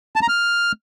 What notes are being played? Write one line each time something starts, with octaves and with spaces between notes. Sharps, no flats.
A5
A#5
F6